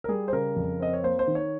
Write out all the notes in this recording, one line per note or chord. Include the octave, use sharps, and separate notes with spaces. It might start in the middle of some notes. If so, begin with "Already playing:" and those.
A#4
G3 G#4
C5
C#3 A#4
F2
C4 D#5
C#5
A#3 C5
C5
D#3
C#5